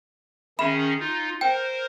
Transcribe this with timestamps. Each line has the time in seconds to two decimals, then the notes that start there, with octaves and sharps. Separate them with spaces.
0.59 D#3 C#4 G#4 E5 B5 E7
0.99 D#4 F4
1.41 A#4 C5 G5